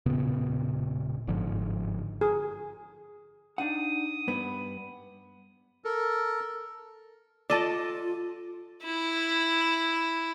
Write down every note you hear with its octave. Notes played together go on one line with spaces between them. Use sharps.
E1 A#2 C#3 B3
G1 G#2 D3 F3
G#4
D4 D#4 F#5 D#6
G2 B3
A4 A#4
F4 A4 D5 D#5 A5
E4